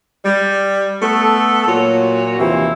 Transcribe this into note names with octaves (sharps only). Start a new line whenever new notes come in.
G3
A3 B3 A4
A#2 F#3 F#4 C#5
D#2 C3 E3 F3